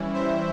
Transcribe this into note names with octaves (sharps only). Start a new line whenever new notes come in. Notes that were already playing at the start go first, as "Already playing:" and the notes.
Already playing: E3 G3 C#4 E4
C5 E5